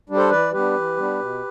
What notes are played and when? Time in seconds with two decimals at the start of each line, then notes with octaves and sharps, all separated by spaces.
0.09 G3 D4
0.16 A4 C5
0.31 E3 B4 D5
0.53 G3 B3 D4 G4 B4
0.76 E3
0.97 G3 B3 D4
1.20 B2